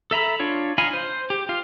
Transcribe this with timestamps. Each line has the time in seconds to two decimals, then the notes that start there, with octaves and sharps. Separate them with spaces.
0.11 A4 E5 A#5 B5
0.40 D4 F4 C#5
0.78 D#4 F4 F5 G#5 B5
0.93 C5
1.30 G4
1.49 F4 F5